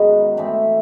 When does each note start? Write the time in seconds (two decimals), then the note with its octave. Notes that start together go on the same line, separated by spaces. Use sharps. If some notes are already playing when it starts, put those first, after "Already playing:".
Already playing: F#2 D#3 G#3 B3
0.37 A2 E3 A3 C4